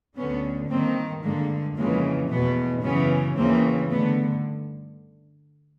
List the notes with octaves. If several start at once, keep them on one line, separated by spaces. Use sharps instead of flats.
D2 D3 B3 C#4
G2 D#3 A#3 C4
G2 D3 G#3 A#3
F2 C#3 E3 G#3 A#3
E2 B2 A3 B3
F#2 C#3 E3 B3 C#4
D#2 C#3 E3 A#3 C4
G2 D3 A3 B3